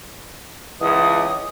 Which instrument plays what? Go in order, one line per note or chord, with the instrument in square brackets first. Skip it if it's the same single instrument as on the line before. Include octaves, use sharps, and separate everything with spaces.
[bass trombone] C#2 [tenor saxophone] E3 [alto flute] D#5 [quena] D#6